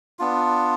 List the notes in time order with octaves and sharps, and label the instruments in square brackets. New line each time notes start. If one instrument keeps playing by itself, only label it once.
[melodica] B3 D4 F4